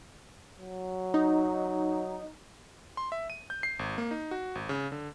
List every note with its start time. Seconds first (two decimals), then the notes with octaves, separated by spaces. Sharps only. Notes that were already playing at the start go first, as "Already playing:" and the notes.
0.58 F#3
1.14 D#4
2.97 C6
3.12 E5
3.30 D#7
3.50 G6
3.63 C7
3.79 G#1
3.98 A#3
4.11 D#4
4.31 F#4
4.55 G#1
4.69 C#3
4.92 D3